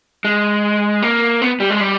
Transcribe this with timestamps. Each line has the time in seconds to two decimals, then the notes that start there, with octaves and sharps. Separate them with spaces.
0.25 G#3
1.02 A#3
1.42 B3
1.60 G3
1.70 G#3
1.80 G3